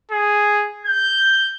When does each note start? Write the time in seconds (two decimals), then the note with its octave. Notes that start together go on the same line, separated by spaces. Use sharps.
0.11 G#4
0.86 G6